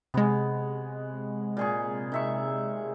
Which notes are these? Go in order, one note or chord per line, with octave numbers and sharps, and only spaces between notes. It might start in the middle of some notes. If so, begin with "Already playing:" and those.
C3 G#3 B3 C#5
A#2 G#4 C#6
D#3 E5 C#6